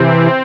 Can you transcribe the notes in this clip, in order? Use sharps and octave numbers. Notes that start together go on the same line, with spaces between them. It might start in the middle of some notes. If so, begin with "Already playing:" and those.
Already playing: C3 E3 C4